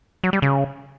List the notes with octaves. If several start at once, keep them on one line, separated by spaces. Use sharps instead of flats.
F#3
G3
C#3